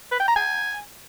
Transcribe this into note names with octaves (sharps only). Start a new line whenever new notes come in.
B4
G5
A#5
G#5